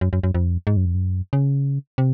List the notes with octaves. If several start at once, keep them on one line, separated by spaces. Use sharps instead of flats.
F#2
F#2
F#2
F2
G#2
F#2
F2
F#2
C#3
C3